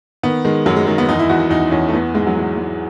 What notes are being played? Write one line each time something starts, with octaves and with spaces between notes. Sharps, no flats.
D#3 B3
D#3 G#3
F#2 F#3
G#3
D#3 G#3
B3
E2 D#4
E4
E2 F#4
F#4
E2 D#4
E2 C#4
A3
E3 B3
G#2 G#3
F#3
E3 G#3
G#2